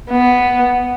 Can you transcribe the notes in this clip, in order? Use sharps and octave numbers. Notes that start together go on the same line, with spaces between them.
B3